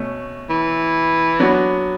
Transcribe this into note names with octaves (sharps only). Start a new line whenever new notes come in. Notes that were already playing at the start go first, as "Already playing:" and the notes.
Already playing: B2 A3 C#4
E3
F#3 B3 D4 F#4